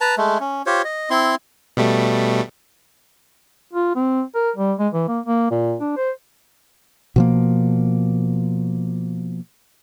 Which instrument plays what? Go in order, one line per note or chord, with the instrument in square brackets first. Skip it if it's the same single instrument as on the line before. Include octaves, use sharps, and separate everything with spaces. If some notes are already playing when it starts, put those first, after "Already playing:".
[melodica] B4 A5 A#5
G#3 A3
C#4
F4 G4 C5 C#5
D#5
C4 E4 C6
[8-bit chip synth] B2 G3 A3
[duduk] F4
C4
A#4
G3
G#3
E3
A#3
A#3
A#2
D4
C5
[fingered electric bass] B2 F3 A#3